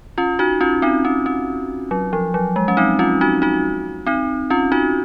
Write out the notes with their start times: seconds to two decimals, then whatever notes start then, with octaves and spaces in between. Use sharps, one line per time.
0.18 C#4 F4
0.39 D#4 F#4
0.61 C#4 F4
0.82 C4 D#4
1.05 C#4
1.26 C#4
1.91 F#3
2.13 F3
2.34 F#3
2.56 G#3
2.68 C#4
2.77 C4 D#4
2.99 C#4 F4
3.21 D#4 F#4
3.42 D#4 F#4
4.07 C4 D#4
4.50 C#4 F4
4.72 D#4 F#4